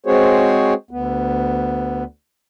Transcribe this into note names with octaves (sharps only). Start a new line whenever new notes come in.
G#3 C4 F#4 G#4 C5 C#5
D2 B3